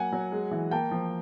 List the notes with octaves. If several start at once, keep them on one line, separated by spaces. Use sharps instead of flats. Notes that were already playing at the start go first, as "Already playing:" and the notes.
Already playing: F#3 A#3 F#5 G#5
F#3
G#3
E3
A#3 G5 A5
F3